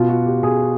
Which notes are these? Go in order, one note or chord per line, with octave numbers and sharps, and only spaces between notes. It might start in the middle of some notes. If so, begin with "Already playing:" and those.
Already playing: B2 F4
F#4
G4
B2 G#4